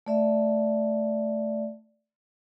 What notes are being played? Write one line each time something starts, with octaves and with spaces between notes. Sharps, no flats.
A3 D5 E5